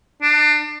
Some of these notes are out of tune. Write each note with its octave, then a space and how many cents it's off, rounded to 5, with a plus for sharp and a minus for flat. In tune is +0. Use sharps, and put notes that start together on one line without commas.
D4 +30